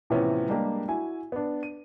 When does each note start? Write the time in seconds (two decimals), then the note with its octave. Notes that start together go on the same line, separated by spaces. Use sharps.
0.10 A2 C3 E3 F3 B3 C#4
0.49 G3 G#3 A#3 D4 G4
0.88 E4 F#4 G#5
1.32 B3 D4
1.63 D#7